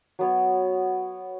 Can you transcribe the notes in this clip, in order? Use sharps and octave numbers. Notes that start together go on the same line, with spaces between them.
F#3 B3 C#5